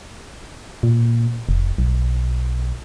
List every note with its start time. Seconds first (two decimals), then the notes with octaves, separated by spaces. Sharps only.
0.83 A#2
1.49 F1
1.78 B1